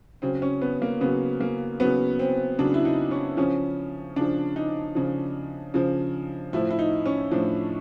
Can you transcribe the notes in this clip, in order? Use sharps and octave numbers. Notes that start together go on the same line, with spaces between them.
C#3 F#3 C4
C#4
B3
A#3
C#3 F#3 B3
A#3
C#3 F#3 B3
C4
C#3 F#3 D4
E4
D#4
C#4
C#3 F3 C#4
C#3 F3 D4
D#4
C#3 F3
C#3 F3
A2 F3 E4
E4
D#4
C#4
A2 F3 D4